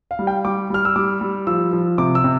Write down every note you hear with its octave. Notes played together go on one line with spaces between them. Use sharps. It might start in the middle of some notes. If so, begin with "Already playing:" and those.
F5
G3
G5
G3 D6
G3 F6
E6
G3 D6
G3
F3 E6
F3
C3 D6
E6
C3